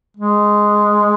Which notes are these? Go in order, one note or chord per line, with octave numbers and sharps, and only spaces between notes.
G#3